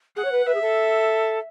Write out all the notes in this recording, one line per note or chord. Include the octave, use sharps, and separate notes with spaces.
G#4 F#5
C#5
B4
B4 E5
G#4
A4